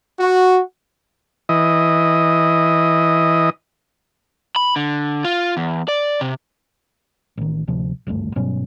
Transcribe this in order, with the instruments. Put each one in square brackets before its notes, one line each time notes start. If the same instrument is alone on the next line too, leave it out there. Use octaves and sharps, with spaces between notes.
[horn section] F#4
[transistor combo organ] E3 D#5
[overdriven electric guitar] B5
D3
F4
E2
D5
C3
[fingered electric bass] A1 D#3
A1 D2 C3 F3
G#1 D2 G2 A3
G2 B2 F#3 C#4